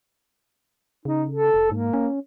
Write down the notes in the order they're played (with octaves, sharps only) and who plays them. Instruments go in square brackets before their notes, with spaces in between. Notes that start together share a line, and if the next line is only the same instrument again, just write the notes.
[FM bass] C#3 [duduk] D#4
[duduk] A4
[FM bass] F1
[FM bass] G#2 [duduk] A#3
[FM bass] C#4